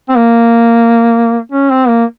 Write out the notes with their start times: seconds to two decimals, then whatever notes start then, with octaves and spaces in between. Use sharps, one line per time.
0.09 C4
0.16 A#3
1.52 C#4
1.71 C4
1.88 A#3